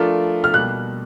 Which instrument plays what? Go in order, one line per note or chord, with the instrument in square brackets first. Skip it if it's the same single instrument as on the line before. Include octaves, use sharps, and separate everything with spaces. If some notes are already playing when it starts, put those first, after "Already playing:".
Already playing: [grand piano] F3 A3 D4 F4 A#4
[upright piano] F6
[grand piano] B2 G3 A#3 [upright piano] F#6